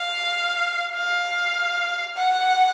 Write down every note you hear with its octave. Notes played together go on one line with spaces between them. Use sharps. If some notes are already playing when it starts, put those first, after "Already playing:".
Already playing: F5
F5
F#5